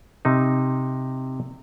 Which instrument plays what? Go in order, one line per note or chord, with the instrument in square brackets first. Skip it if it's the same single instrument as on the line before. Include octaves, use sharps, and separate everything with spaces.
[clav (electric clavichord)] C3 D#4